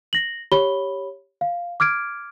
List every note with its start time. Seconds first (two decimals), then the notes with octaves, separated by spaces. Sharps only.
0.13 A#6 F#7
0.52 G4 C#5 B5 G7
1.41 F5
1.80 D6 F6 G#6 D7